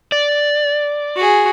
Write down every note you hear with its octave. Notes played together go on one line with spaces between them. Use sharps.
D5
F#4 G#4